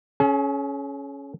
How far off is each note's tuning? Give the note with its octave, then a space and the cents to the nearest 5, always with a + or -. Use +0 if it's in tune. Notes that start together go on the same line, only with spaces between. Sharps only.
C#4 +0 G#4 +45